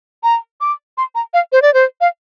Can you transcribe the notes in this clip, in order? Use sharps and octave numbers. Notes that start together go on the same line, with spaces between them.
A#5
D6
C6
A#5
F5
C5
D5
C5
F5